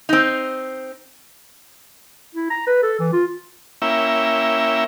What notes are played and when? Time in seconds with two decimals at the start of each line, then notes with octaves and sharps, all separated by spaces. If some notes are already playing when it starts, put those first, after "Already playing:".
0.09 C4 D#4
2.35 E4
2.50 A#5
2.67 B4
2.83 A4
2.99 E3
3.13 F4
3.82 A#3 C#4 E4 E5 G5